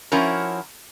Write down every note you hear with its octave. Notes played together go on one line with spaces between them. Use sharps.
F3 C#4 E4 F#4 A#4